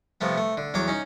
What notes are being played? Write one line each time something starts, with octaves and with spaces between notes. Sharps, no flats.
C3 F3 A3 B3
A3
D3
E2 F#3 C#5 D6
C#4 D#4